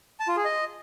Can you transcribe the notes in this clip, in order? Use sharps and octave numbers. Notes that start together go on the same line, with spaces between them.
A5
F4
G#4
D#5